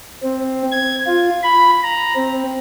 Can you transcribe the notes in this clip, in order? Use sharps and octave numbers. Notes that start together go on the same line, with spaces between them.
C4
G#6
F4
B5
A#5
C4